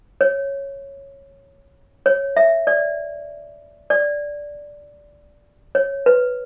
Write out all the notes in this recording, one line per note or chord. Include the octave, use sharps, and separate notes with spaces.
C#5
C#5
E5
D5
D5
C#5
B4